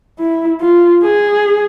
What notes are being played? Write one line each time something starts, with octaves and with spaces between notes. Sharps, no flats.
E4
F4
G#4